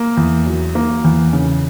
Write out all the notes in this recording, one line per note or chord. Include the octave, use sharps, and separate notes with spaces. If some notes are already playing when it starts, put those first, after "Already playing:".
Already playing: A#3
E2
F#3
A#3
E2
C#3